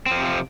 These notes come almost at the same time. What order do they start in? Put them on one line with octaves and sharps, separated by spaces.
C4 F3 C3